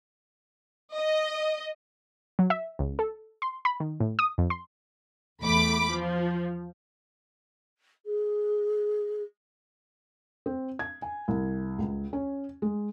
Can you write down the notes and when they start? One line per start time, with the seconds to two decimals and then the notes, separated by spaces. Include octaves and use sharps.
0.94 D#5
2.39 F#3
2.50 E5
2.79 C#2
2.99 A4
3.42 C6
3.65 B5
3.80 D#3
4.00 A2
4.19 D#6
4.38 F2
4.50 C6
5.42 E2 A3 B5 D6
5.91 F3
8.05 G#4
10.46 C4
10.79 G#6
11.02 G#5
11.28 C2
11.78 C#2
12.13 C#4
12.62 G#3